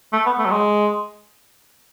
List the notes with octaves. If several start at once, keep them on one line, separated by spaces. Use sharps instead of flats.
A3
B3
A3
F#3
G#3